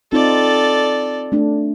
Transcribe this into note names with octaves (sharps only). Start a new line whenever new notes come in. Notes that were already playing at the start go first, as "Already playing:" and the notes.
C4 D#4 F4 A4 D5
A3 D4